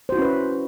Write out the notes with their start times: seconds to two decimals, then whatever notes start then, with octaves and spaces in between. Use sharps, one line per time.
0.09 C5
0.12 F#4
0.15 E4
0.19 C#4
0.22 B4